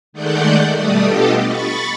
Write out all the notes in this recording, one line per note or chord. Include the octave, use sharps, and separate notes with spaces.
D#3 G#3 A3 D5 F#5 G6
B2 G3 A3 D5 D#6
B3 D4 F4 G4 A4 D#5
B5 C#6 A6